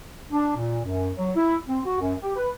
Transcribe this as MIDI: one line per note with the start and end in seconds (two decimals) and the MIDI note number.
0.31 0.53 62
0.57 0.80 46
0.85 1.11 42
1.16 1.31 54
1.36 1.57 64
1.68 1.80 60
1.85 1.99 66
2.00 2.14 42
2.22 2.36 67
2.36 2.49 71